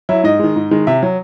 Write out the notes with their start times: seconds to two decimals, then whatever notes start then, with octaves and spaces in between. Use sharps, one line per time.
0.09 F#3 E4
0.24 G#2 D#5
0.39 D#3 G#3
0.56 G#2
0.71 D#3 G#3
0.87 C3 E5
1.03 F#3